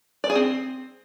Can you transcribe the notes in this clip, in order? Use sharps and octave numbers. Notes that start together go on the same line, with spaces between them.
D5
G#4
C4